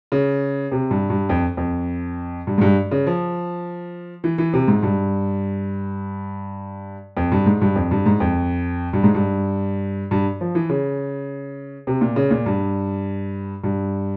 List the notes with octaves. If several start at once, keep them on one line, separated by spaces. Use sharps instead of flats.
C#3
C3
G2
G2
F2
F2
G2
G#2
G2
C#3
F3
E3
E3
C3
G#2
G2
F2
G2
G#2
G2
F2
G2
G#2
F2
G2
G#2
G2
G2
F3
E3
C#3
C3
A#2
C#3
A#2
G2
G2